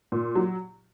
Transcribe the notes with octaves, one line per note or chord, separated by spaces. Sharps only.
A#2
F#3